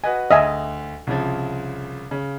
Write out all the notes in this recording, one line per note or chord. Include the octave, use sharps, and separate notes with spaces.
F#4 B4 D#5 G#5
D2 D#5 E5 G#5
C2 C#3 F3
C#3